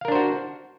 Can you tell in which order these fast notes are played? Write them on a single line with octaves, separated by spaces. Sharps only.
F5 A#4 D4 C5 F#4